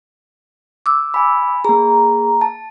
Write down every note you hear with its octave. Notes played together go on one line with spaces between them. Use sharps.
D6 E6
G#5 B5
A#3 G#4 A#5
A5